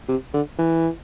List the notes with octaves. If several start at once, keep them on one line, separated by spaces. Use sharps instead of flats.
C3
D3
E3